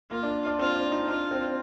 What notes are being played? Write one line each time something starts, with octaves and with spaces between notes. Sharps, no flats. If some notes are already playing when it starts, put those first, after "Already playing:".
A#3 F4
D4
D4
C4 F4
D4
D#4
D4 F4
C4